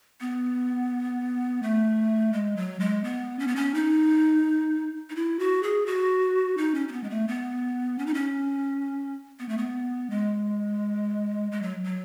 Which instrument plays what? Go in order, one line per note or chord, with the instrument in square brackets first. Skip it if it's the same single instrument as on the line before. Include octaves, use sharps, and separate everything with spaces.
[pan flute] B3
A3
G#3
F#3
G#3
B3
C#4
B3
C#4
D#4
D#4
E4
F#4
G#4
F#4
D#4
C#4
C#4
B3
G#3
A3
B3
C#4
D#4
C#4
B3
A3
B3
G#3
G#3
F#3
F#3